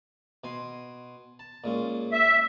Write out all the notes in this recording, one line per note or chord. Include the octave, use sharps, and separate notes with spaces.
B2 G#5 C6
A5
A#2 G#3 C#4
E5